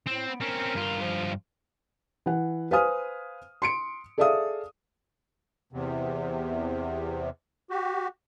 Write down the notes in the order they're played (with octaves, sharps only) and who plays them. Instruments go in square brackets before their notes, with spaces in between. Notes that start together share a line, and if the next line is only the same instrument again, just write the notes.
[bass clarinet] A2 [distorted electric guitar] C4
[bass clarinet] B3
[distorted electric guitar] C4 C#4 [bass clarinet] A#4
[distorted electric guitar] G2 F4
[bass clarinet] F3
[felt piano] E3 F#5
B4 C5 F5 G#5 D#6 F6
C6 C#7 D7
G#4 A4 D5 E5 F5 D#6
[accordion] E2 C3
F#4 G4